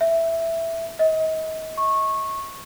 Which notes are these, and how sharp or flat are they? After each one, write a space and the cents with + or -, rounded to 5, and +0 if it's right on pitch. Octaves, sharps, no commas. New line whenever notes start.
E5 +5
D#5 +35
C#6 -15